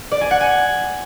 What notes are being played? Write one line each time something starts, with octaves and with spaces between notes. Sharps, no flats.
D5
G#5
F#5
G#5